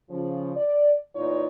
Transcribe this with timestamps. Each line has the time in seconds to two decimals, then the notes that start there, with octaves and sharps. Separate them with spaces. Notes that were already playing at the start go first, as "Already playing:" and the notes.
0.10 C#3 F3
0.56 D5
1.15 A#2 E3 D#4 F4 C#5 D5